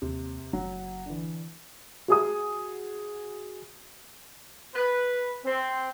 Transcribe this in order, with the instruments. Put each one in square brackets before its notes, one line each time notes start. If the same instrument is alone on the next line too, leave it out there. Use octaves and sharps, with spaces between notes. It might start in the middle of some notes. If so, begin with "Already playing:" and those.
[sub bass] D#2 [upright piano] C3
[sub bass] F#1 [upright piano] F#3
[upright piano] D3 E3
F#4 G#4 D#6
[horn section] B4
C4